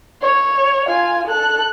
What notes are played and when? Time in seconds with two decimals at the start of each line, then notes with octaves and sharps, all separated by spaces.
0.22 C#5
0.87 F4 G#5
1.27 A4 F#6